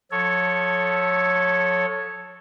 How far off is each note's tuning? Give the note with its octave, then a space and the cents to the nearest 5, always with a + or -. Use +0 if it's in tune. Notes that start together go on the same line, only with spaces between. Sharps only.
F3 +30 A4 +0 C#5 +0